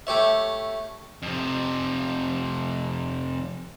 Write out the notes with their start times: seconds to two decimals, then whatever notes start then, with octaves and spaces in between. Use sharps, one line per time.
0.07 A3 G4 C#5 E5
1.22 F2 C3